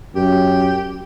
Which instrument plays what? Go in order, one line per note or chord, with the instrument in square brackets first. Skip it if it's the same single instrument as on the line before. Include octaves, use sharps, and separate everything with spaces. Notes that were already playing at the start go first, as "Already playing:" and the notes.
[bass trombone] F#2 [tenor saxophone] G4